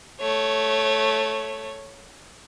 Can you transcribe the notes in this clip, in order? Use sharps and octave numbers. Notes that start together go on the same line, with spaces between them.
A3 C#5